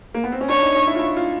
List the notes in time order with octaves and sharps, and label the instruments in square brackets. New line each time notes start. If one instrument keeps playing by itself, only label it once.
[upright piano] A#3
B3
C4
C#4
[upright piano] D4 [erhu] C#5
[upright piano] D#4
D#4
E4
F4
E4
F4